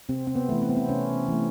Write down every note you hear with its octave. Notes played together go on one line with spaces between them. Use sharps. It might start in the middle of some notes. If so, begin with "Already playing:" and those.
C3 C4
C4
B3
E3 A3
C4
B3
C4
C3 C#4
E3 A3